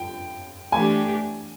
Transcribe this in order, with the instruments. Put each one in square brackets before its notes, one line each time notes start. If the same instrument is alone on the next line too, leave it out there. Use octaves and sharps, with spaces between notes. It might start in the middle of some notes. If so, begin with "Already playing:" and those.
Already playing: [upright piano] G5
[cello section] E3 A3 D4 G4 [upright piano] G#5